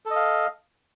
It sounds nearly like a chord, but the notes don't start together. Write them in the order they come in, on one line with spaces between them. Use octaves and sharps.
A4 D#5 F5